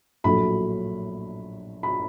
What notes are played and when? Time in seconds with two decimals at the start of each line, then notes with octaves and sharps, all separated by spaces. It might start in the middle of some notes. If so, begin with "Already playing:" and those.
0.24 A#1 A2 F#3 A3 B5
1.83 B5